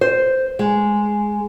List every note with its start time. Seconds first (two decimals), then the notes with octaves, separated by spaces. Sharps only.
0.01 C5
0.59 G#3